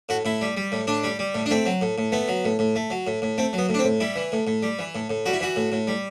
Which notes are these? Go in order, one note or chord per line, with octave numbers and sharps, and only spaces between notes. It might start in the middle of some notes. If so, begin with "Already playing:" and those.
A2 F#4
A2 E4
G3
G3
A2
A2 D4
G3
G3
A2
D4
A3 C4
F#3
A2
A2
A3 B3
F#3
A2
A2
A3
F#3
A2
A2
A3 C4
F#3
B3
A2
D4
C4
A2
G3 E4
E3
A2
A2
G3
E3
A2
A2
G3 F#4
E4
E3 F#4
A2
A2
G3